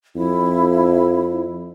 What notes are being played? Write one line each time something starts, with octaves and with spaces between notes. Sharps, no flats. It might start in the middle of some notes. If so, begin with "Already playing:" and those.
F2 E4